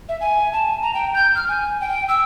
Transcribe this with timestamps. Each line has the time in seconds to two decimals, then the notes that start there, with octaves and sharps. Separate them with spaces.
0.09 E5
0.21 G#5
0.53 A5
0.82 A#5
0.94 G5
1.14 G6
1.35 F6
1.49 G#5
1.81 G5
2.09 E6